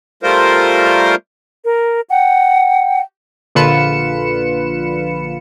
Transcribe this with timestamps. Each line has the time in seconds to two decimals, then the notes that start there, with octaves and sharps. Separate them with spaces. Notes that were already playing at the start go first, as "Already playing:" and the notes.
0.23 G3 A3 F4 A#4 C5
1.63 A#4
2.09 F#5 G5
3.55 A#1 D3 F4 B4 C#7 E7